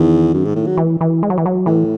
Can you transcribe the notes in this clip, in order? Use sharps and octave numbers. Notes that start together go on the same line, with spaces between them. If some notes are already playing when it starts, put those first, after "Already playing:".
Already playing: E2 D#3
F#2
G#2
A2
F#3
E3
E3
G#3
F#3
E3
F#3
A2 E3